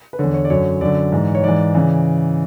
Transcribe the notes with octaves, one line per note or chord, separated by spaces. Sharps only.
B4
E2 D3 C#5
C#5
D5
F#2 D3 C#5
F#2 D3 D5
G#2 E3
C#5
G#2 E3 D5
C#3 E3